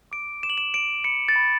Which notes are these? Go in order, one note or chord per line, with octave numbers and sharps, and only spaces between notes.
D6 D7
D6 E7
F#7
E7
D6 D7
B5 C#7
A6
B5